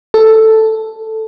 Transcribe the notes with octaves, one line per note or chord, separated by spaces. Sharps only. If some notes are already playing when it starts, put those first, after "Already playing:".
A4